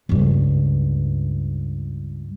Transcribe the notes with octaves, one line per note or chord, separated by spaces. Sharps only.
C#2 G2